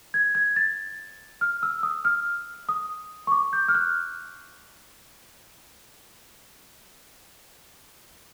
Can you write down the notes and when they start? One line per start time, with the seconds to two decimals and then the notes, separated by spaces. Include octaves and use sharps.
0.14 G#6
0.35 G#6
0.56 A6
1.41 F6
1.63 E6
1.83 D#6
2.05 F6
2.69 D#6
3.27 C#6
3.32 D6
3.53 G6
3.68 F6
3.75 F#6